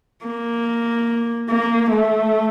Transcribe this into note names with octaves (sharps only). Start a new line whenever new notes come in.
A#3
A#3
A3